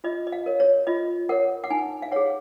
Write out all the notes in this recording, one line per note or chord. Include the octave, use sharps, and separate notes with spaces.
F4 D#5
D#5
F5
A#4 C#5
C#5
F4 D#5
A#4 C#5 F#5
F#5
D#4 G#5
F5
G#4 C#5 F#5